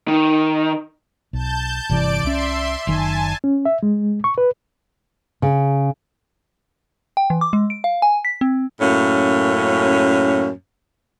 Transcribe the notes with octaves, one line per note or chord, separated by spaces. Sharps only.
D#3
B1 A5 G6
G1 C3 E3 D5 D7
C2 C#4 E5 C6
F#1 D#3 G#5 A5
C#4
E5
G#3
C#6
B4
C#3
G5
E3
D6
G#3
D7
F5
G#5
B6
C4
F#2 A2 A#3 C#4